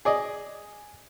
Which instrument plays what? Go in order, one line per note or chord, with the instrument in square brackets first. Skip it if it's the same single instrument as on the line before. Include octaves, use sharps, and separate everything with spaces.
[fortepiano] G#4 D5 D#5